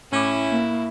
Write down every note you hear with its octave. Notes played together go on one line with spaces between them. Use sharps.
A2 C#4 E4 D6
A#3